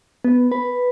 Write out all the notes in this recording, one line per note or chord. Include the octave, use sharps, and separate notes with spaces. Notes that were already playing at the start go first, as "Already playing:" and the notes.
B3
B4